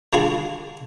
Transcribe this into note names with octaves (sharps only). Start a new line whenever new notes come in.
D3 G3 F4 G#4 G#5